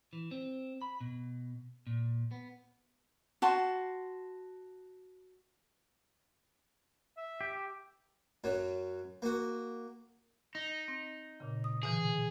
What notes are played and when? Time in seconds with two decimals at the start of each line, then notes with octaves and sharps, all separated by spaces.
0.13 E3
0.31 C4
0.82 B5
1.01 B2
1.87 A#2
2.31 B3
3.42 F#4 A5 C6
7.17 E5
7.41 G4
8.44 F#2 F#3
9.22 A#3 F#4
10.55 D#4
10.88 C4
11.40 A#2 C#3
11.64 D#6
11.83 B2 D3 E3 G#4